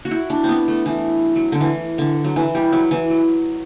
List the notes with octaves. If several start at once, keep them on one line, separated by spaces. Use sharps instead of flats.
F#4
E4
D4
C4
B3
A3
E3
F#3
D3
E3
D3
F#3
E3
G3
F#3
E3
F#3